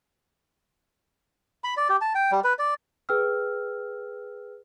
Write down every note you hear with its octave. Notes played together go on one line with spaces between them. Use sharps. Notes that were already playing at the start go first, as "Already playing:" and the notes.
B5
D5
G4
A5
G5
G3
B4
D5
G#4 B4 G5 E6 F6